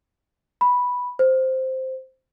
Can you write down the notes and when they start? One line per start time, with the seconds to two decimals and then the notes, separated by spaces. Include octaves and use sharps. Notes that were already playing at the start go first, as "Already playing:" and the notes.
0.61 B5
1.19 C5